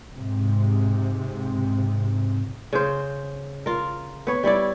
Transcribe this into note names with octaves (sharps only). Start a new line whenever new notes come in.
G#2 C3
C#3 C5
F4 A#4
B3 C#5
G3 E4 C#5 D5